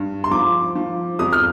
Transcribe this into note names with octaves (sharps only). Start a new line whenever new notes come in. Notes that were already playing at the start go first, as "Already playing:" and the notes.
Already playing: G2
C6
F3 D6
F3
F2 D#6
F6